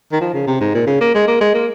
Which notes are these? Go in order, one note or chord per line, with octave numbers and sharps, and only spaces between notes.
D#3
F3
C#3
C3
G#2
A#2
C#3
A#3
G#3
A#3
G#3
A#3